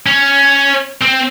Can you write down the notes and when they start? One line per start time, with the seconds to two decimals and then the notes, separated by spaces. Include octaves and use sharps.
0.06 C#4
1.01 C4